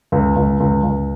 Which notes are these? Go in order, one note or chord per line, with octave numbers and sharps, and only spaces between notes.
C#2
C#2
C#2
C#2